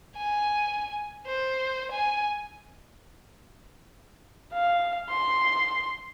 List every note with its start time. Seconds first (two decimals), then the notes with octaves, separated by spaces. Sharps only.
0.17 G#5
1.27 C5
1.92 G#5
4.54 F5
5.10 C6